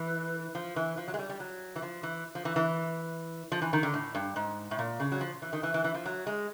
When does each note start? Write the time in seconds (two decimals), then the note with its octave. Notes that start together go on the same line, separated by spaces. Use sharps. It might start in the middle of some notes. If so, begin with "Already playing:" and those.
Already playing: E3
0.55 F3
0.76 E3
0.97 F3
1.08 F#3
1.14 G#3
1.19 G3
1.29 G3
1.40 F#3
1.76 E3
1.82 F3
2.03 E3
2.35 F3
2.45 E3
2.56 E3
3.52 F3
3.62 E3
3.73 D#3
3.83 D3
3.94 A2
4.15 G2
4.36 G#2
4.71 A2
4.79 A#2
5.00 C#3
5.12 F#3
5.21 F3
5.42 E3
5.53 D#3
5.63 E3
5.74 E3
5.84 E3
5.94 F3
6.06 F#3
6.27 G#3